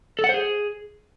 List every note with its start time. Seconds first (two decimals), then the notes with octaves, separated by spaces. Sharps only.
0.19 A4
0.24 F#5
0.29 C5
0.34 G#4